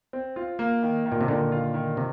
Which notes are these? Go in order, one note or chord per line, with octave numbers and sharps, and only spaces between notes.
C4
F4
A#3
D#3
D#3
A#2
C3
A#2 D3 D#3
F4
D#3
C3